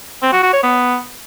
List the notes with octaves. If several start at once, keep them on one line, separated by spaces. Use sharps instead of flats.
C4
F#4
F#4
C#5
B3